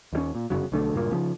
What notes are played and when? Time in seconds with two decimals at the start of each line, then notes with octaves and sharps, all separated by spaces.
0.13 D#2 G3 C#4
0.35 A#2
0.50 G1 F#2 C#3 F#3
0.72 B1 D3 A3
0.94 C#2 G2 A#2 A#3
1.11 C#3 F3